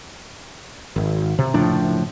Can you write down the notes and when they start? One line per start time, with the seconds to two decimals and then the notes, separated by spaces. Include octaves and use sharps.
0.96 G#1
1.39 C3
1.54 F#1 A2 F3 D4